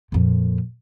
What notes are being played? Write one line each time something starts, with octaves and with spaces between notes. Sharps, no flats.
F2 A#2